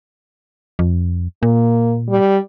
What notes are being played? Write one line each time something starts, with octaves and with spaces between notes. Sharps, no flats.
F2
A#2 A#3
G3